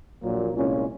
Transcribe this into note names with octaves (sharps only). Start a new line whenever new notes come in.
A#1 A#2 F#3 A#3
C2 A#2 G#3 C#4 F4